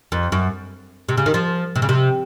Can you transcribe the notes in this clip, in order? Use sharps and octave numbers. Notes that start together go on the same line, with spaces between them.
F2
F#2
C3
C#3
D#3
F3
C3
C#3
C3